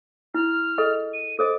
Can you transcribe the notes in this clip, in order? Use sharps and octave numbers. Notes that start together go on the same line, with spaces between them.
E4 F6
G#4 A4 D#5
D#7
A4 C5 D#5 D6